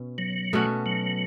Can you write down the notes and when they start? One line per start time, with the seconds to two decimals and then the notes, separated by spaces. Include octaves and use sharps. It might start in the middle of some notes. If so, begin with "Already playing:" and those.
Already playing: B2 C#4
0.18 F#3
0.53 B2 A3 C#4 F#4
0.86 F#3